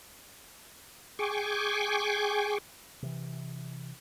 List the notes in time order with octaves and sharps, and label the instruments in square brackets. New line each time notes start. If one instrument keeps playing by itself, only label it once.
[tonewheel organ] G#4 G5 G#5 C#6 D6
[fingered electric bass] C3 E3